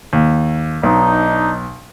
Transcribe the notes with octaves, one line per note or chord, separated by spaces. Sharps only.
D#2
B1 D4 D#4